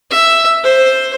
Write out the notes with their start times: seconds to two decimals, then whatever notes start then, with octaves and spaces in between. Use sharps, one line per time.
0.10 E5
0.64 C5